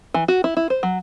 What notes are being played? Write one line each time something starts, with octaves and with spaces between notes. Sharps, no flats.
E3
F#4
E4
E4
C5
F#3